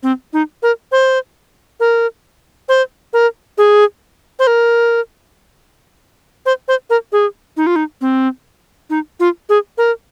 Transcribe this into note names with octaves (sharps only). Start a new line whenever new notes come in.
C4
D#4
A#4
C5
A#4
C5
A#4
G#4
C5
A#4
C5
C5
A#4
G#4
D#4
F4
D#4
C4
D#4
F4
G#4
A#4